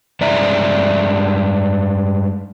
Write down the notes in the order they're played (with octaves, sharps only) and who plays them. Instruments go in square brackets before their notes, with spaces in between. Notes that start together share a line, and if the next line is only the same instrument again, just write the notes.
[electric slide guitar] G2 G#3 D5 E5 A#5